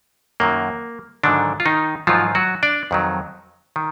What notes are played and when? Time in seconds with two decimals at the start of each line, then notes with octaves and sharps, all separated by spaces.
0.40 F#2 D#3 F#3 A#3
1.23 G#2 D3 D#3 F#3 D4
1.60 F4
1.66 D#3 D#4
2.07 G#2 D#3 F3 F#3 F4
2.35 F#3 F#4
2.63 D4 D5
2.91 F2 D#3 F#3
3.76 D#3